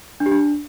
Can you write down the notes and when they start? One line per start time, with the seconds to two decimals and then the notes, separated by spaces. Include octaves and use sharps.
0.20 D4
0.26 G4
0.31 D4